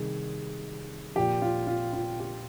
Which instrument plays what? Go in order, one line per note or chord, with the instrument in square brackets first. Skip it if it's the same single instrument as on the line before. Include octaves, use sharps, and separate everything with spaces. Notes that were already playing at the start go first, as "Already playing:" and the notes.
Already playing: [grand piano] C3 D#3 G3 G#4
A#2 F3 G4
F4
F4
F4
G4